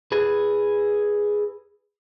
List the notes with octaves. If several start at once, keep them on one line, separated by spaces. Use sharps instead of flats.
G#4 B4